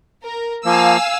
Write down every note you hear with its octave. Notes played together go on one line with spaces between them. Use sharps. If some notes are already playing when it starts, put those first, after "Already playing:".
A#4
F3 A#3 F5 G#5 E6